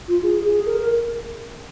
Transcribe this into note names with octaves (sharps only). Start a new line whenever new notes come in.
F4
G#4
G#4
A#4
A#4